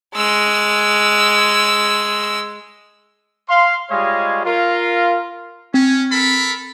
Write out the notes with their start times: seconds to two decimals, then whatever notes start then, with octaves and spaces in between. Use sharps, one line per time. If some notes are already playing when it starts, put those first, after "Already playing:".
0.15 G#3 E6
3.49 F5 C6
3.90 G3 G#3 F4 C#5 D#5 F5
4.46 F4 A#4 F5
5.74 C4 C#4
6.12 A4 A#4 B5